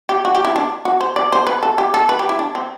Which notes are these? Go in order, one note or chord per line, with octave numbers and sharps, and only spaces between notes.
G4
F#4
G4
E4
D4
F#4
C5
D5
C5
B4
A4
G4
A4
B4
G4
E4
D4
C4